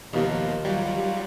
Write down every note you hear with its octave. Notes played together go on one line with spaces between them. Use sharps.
D#2 B2 F3 A#3
F#3 G3 F4